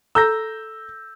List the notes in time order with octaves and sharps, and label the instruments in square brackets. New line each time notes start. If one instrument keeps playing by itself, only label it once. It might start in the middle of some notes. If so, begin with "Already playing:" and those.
[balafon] A4 A#5 [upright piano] E6 G6 A#6